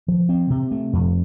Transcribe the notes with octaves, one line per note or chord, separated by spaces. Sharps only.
F3
C4
C3
A3
F2